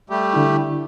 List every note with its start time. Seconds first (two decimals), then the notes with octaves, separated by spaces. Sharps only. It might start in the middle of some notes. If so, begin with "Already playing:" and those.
0.10 G3 A3 G4
0.34 D3 E4